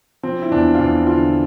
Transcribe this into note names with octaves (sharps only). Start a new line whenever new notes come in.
F3 C4
E4
E2 D4
F4
E2 E4
D3 F4